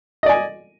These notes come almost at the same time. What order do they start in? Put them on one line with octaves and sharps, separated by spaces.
D#5 D5 G#5